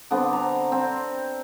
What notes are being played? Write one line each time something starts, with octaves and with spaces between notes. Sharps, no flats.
D3 B3 C4
A#5
C4